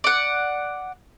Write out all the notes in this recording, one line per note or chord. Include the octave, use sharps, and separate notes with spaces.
D5 F#5